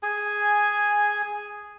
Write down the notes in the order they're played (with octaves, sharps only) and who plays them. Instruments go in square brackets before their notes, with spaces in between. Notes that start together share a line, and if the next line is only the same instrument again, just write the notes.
[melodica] G#4 G#5